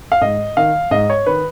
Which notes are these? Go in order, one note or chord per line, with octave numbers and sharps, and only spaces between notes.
F5
G#2 D#5
D#3 F5
G#2 D#5
C#5
D#3 B4